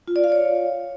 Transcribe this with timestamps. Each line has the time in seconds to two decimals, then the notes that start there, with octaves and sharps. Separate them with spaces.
0.08 F4
0.16 D5
0.24 F5
0.32 C#5